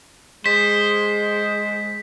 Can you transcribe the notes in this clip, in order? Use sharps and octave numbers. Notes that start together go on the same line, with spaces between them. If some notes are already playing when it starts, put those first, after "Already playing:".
G#3 C5 B6